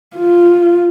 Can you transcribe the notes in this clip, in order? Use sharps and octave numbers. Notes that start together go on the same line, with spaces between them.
F4